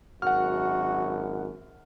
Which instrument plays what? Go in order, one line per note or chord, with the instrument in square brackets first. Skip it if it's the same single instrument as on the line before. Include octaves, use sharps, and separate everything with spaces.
[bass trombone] G#1 [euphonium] F#2 [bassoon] F#4 [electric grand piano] F#5 F6